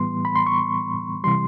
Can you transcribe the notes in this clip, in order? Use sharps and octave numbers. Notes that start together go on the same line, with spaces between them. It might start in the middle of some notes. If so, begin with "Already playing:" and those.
Already playing: A2 E3 G3 B3 C6
B5
C6
C#6
C3 E3 G3 C6